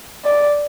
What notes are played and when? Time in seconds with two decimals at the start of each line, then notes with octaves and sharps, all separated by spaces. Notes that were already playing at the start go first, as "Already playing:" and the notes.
0.25 D5